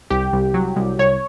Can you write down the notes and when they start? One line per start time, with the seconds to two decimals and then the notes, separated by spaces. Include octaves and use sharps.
0.10 C2 G4
0.33 C2
0.54 F#3
0.76 C2
0.99 C2 C#5